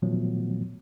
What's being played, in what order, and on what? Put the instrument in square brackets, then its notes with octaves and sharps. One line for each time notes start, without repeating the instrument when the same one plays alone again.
[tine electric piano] A#2 D#3 F3 F#3 A3 B3